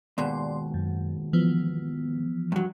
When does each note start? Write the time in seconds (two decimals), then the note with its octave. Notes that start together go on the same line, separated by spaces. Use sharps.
0.18 D#2 G#2 B2 D5 C6
0.74 F#2
1.33 E3 F3 B3
2.52 G2 F#3